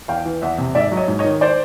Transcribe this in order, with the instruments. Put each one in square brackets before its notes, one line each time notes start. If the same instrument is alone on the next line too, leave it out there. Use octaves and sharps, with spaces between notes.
[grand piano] E2 F5 G5
E3
E2 E5 F#5
C3
G#2 D5 E5
F#3
C#5 D#5
G#2
C#5 D#5
D#3
C5 D5